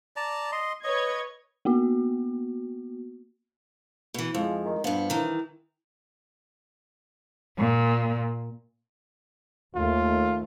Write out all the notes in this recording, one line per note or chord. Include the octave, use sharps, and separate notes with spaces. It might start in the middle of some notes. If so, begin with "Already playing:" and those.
D5 A5 A#5
D#5 C6
B4 C#5 D#5 G#6
A#3 B3 F#4
B2 E3
F2 F3 G#3
D#3
G2 F3 B3 D4
D#3 E3
A#2
D#2 A3 F4